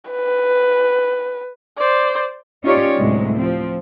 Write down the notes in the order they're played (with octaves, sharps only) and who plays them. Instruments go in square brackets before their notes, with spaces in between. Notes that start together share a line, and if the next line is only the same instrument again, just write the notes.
[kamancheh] B4
C5 D5
[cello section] C#4 D#4 F4 G4 C#5 D5
D2 A2 C3 F#3 G#3
F3 C4